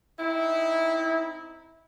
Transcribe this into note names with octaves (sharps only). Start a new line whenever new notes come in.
C4 D#4 E4